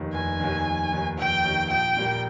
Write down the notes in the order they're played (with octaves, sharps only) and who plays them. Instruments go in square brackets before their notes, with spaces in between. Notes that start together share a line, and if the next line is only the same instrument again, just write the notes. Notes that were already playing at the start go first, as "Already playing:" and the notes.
Already playing: [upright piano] F1 D#2 D#3
[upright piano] F1 [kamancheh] G#5
[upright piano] D#2 D#3
F1
D#2 D#3
[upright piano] F1 [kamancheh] G5
[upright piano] D#2 D#3
[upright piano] A#1 [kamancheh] G5
[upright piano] A#2 G3 A#3